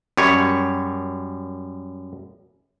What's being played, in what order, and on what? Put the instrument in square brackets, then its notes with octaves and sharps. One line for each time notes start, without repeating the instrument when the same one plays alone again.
[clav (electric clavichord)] F#2 G3 C#5